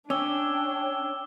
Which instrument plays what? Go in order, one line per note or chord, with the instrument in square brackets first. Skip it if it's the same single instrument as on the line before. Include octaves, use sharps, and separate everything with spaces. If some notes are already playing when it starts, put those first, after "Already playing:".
[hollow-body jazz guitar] C#4 [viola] D4 [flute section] C#5 G5 [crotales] D6 E6 G7